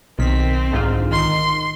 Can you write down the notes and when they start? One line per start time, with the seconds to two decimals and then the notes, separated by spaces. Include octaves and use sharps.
0.19 B1 D#3 C4 B6
0.71 D2 G#2 F4
1.11 D#3 C6 C7